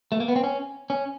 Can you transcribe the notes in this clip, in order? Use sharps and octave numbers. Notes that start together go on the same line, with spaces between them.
A3
A#3
B3
C4
C#4
C#4